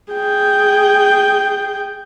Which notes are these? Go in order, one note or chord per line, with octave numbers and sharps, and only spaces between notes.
G#4 G5